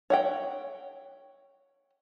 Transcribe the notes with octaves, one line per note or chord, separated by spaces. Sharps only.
C#5 F#5 G5